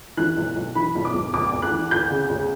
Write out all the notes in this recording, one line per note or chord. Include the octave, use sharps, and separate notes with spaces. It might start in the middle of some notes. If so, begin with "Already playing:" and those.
E3 F#6
B1
B1
E3 B5
B1
D6
B1
D2 D6
D2
F#6
E3
D2 G6
C#3
D2